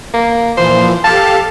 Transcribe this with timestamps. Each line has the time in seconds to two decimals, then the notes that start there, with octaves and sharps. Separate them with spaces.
0.14 A#3
0.57 A#2 E3 F3 C5
1.04 G4 A4 F5 A5